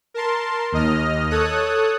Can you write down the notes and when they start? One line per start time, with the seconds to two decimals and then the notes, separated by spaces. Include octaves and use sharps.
0.14 A#4 A5 C6
0.72 D#2 D#5 F6
1.30 A4 C#5 D#6 F#6